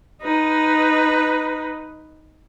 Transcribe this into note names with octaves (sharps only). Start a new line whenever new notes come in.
D#4 B4